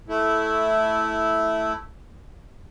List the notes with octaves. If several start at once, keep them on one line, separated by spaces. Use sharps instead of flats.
A3 E4